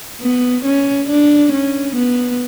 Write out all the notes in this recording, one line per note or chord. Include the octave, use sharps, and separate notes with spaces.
B3
C#4
D4
C#4
B3